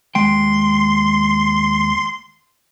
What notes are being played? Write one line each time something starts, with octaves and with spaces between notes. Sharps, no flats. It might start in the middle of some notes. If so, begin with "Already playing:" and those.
D#2 G#3 G5 C6